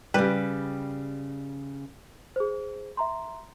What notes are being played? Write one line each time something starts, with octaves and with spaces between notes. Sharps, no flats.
C#3 G3 G4 B4
G#4 C5
E5 A#5 C6